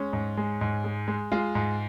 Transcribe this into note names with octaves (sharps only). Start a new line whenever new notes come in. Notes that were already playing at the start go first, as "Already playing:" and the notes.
Already playing: G#3 C#4
G#2
G#3
G#2
G#3
G#3
G#3 F4
G#2